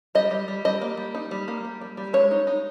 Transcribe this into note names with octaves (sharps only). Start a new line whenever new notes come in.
G3 D#5
G3
G3
G3 D#5
A#3
G3
D#4
G3
A#3
G3
G3
G3
G#3 C#5
D#4
D#4